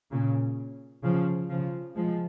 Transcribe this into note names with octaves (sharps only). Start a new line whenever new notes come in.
A#2 C#3
C#3 F3
C#3 F3
F3 G#3